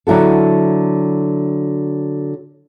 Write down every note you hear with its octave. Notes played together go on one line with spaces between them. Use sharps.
D3 F#3 E4 F#4 A4